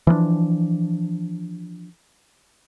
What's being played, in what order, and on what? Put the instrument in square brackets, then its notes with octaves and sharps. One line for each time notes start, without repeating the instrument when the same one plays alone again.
[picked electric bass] E3 F3 G#3 D4